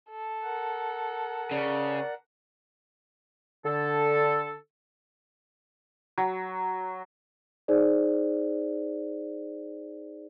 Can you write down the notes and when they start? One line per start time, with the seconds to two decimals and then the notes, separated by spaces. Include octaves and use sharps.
0.10 A4
0.43 A#4 F#5
1.51 C#3 D5
3.65 D3 A4
6.18 F#3
7.68 D#4 G#4 C5 D5